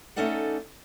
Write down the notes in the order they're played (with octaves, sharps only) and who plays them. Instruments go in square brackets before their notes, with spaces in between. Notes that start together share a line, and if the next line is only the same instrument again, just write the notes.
[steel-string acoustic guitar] A3 C#4 D#4 A4 D5 F#5